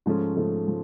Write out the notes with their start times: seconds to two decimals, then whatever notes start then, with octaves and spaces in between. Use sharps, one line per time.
0.06 G#2 F3 A3 C#4
0.37 G#2 F3 A3 C#4
0.68 F3